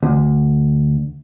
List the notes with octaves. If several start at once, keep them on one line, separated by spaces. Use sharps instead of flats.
D2